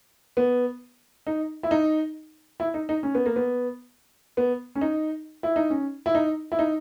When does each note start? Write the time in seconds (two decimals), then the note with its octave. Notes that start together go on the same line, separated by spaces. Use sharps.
0.37 B3
1.27 D#4
1.63 E4
1.71 D#4
2.60 E4
2.74 D#4
2.89 D#4
3.03 C#4
3.15 B3
3.26 A#3
3.36 B3
4.37 B3
4.75 C#4
4.81 D#4
5.43 E4
5.56 D#4
5.70 C#4
6.06 E4
6.15 D#4
6.52 E4
6.59 D#4